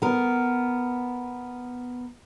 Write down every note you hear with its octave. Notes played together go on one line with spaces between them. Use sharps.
B3 A#4